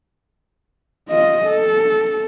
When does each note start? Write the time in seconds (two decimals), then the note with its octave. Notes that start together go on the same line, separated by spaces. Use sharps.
1.09 F4 D#5
1.45 A4